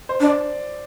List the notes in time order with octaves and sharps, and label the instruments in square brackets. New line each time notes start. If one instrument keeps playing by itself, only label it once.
[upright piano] C5
[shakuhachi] D4
[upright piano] D5